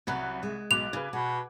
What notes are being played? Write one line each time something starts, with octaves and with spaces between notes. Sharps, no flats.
C2 F#3 C#4 B5 F#6
G#3
B1 D6 F#6 F7
C#3 B4 G#6
B2 F#4